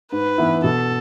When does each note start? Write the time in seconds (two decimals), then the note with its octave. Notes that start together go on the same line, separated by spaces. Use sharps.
0.12 G#2 B4
0.38 E3 B3 E4
0.64 B2 A4